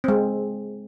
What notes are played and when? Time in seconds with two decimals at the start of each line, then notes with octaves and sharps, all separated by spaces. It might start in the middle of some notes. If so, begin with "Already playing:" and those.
0.04 G#3 C4